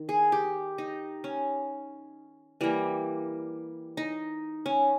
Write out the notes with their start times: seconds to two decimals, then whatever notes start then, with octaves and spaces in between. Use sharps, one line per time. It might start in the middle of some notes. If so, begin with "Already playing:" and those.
Already playing: D#3
0.09 G#4
0.32 G4
0.78 D#4
1.24 C#4
2.61 E3 G3 A#3
3.97 D#4
4.66 C#4